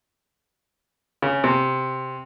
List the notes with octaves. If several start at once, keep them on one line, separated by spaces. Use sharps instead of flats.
C#3
C3